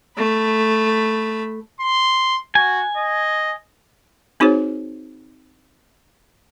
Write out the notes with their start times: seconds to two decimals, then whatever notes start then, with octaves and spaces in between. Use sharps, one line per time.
0.17 A3 B5
1.80 C6
2.55 F#4 G#5
2.97 D#5
4.40 C4 D#4 F#4 G#4 C5 C#5